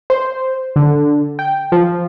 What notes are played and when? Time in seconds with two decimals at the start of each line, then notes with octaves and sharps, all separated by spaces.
0.10 C5
0.76 D3
1.39 G5
1.72 F3